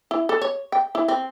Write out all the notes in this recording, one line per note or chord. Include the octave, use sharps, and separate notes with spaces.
E4
A4
C#5
G5
E4
C4